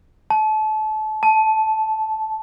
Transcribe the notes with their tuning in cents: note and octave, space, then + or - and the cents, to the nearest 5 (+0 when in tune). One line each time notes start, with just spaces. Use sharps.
A5 -30
A5 -10